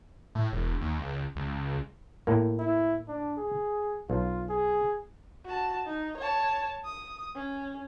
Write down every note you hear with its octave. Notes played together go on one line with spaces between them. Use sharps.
A2
E1
D#2
C#2
C#2
A2 A#3
E4
D4
G#4
B1 F4
G#4
F#4 A5
D#4
C#5 A5
D#6
C#4